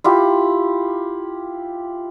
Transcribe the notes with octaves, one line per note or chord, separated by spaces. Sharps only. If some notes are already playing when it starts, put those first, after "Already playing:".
E4 F4 G4